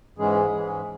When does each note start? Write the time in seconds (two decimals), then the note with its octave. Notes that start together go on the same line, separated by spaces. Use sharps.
0.18 G#2 E3 G#3 C#4 G#4
0.53 G#2 E3 G#3 C#4